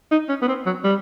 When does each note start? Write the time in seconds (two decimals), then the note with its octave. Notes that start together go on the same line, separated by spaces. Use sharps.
0.11 D#4
0.29 C#4
0.42 B3
0.48 C4
0.66 F#3
0.84 G3